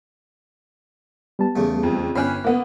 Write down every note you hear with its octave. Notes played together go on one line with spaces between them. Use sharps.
G3 B3 A5
E2 C#3 A3
F2
G1 C#4 F5 G5 G#5 B5 F6 F#6
A#3 B3